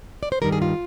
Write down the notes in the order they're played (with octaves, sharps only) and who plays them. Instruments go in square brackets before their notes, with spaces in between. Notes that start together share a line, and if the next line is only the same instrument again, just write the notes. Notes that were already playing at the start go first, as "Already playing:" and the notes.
[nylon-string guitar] D5
C5
G2 D#3 G3 A#4
G#4
F4